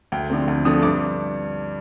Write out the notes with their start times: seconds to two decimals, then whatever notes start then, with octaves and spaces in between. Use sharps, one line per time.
0.12 D2 G5
0.30 D3 F3 A3 C4
0.48 D2
0.65 D3 F3 A3 C4 D#6
0.83 G2 D6